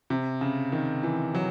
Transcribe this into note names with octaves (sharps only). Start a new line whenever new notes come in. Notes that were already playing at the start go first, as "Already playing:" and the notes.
C3
C#3
D#3
E3
F#3